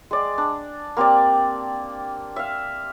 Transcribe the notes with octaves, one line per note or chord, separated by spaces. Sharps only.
G#3 D5
D4
A#3 C4 G4 D5
E5 F5